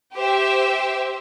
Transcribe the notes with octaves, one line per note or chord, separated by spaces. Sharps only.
G4 C5 E5